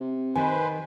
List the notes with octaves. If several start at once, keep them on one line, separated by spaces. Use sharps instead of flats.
C3
D#3 D#4 B4 C5 G#5